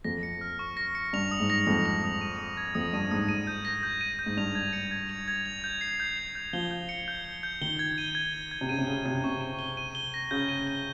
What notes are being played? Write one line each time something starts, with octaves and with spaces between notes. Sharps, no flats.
F2 A#6
C#7
F6
C#6
A#6
C#7
G2 F7
D#6
G#2
A#6
F2 D#6
F7
D#6
D#7
D#6
G#6
F2 D#6
G2 D#7
G#2 D#6
D#7
G6
A#6
G6
D#7
G6
G#2
G2 F7
G#6
C#7
G#6
F7
G#6
F7
G6
C7
G6
F7
G6
F3 G7
G6
C#7
G6
G7
G6
D#3 G7
G#6
D#7
G#6
G7
G#6
C3
C#3 D#7
C3
C#3 G7
C3 G#6
C3 C#6
D#7
G7
D#7
G7
A#6
C#3 G6
D#7
G7